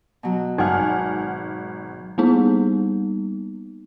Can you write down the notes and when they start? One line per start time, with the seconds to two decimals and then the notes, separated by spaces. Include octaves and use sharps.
0.23 B2 F#3
0.58 G#1 F#5 G#5 A5 F6
2.18 G3 A#3 B3 D#4